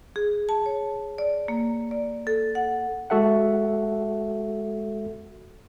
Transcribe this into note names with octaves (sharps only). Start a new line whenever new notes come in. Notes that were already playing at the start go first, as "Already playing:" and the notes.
G#4
A5
C#5
D5
A#3
D5
A4
F#5
G#3 F#4 A4 E5 F#5